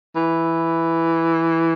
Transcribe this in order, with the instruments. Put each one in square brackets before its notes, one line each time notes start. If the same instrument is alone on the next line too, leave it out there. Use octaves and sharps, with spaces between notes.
[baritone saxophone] E3